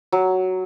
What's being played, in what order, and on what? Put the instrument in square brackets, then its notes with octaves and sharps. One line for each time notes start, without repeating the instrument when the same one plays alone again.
[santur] F#3